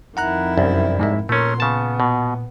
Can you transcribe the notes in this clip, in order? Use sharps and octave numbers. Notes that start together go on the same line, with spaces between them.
F2 D#3 E4 F#5 A#5 F#6
C2 F#2
G#2 G#3 E5
A#2 A3 C#4 A#4 C6
C#3 B3 A5
B2